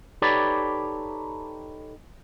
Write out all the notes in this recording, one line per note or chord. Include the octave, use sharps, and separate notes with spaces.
D#4 G4 A4 B4 C#5 D5